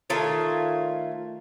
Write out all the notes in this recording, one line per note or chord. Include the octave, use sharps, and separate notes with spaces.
D#3 A3 F4 C#5